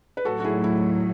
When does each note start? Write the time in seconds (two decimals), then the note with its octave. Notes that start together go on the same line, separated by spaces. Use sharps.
0.17 B4
0.25 A2 F#3 A3 F#4 A4
0.40 F#4
0.44 E4 G#4
0.64 E4